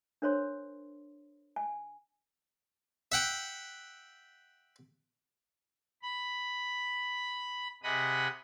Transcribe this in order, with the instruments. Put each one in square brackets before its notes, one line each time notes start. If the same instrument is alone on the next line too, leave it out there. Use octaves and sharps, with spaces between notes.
[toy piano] D4 A#4 C5 C#5 C6
G#5
[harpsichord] E5 F#5 G5
[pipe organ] B5
C3 G#4 D#5 F#5 B5 D#6